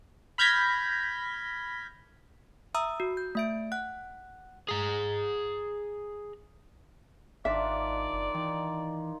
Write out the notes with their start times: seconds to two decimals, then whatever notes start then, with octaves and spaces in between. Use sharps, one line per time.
0.38 B5 F6 G6 G#6 A#6 B6
2.74 E5 A#5 D#6 E6
3.00 F#4
3.17 G6
3.35 A3 E5 D7
3.72 F#5 F#6
4.68 G#4 A#5
7.45 G#1 D#3 D4 F4 D5 E5
8.13 F#1
8.35 D#3 E3